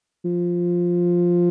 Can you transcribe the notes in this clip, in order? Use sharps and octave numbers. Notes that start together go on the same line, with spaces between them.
F3